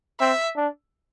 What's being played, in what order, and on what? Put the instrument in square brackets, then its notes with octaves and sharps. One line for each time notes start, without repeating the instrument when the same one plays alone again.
[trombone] C4 [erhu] E5
[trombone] D4